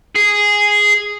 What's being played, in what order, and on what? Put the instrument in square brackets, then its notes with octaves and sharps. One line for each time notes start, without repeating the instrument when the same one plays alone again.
[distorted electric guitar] G#4